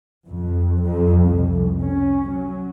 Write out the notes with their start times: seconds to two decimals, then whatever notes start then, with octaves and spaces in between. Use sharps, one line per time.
0.27 F2
0.84 F2
1.24 C2
1.83 C#4
2.31 F#3